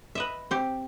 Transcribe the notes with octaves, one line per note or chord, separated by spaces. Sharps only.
B4 D#5 E5
C4 G4